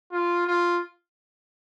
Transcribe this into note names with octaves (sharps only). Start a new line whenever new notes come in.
F4
F4